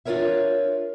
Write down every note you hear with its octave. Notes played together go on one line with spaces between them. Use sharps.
D4 F4 F#4 A#4 C#5 E5